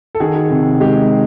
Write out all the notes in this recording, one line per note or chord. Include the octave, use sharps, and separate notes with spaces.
A4
D#3 F#4 G#4
C3
G#3 G4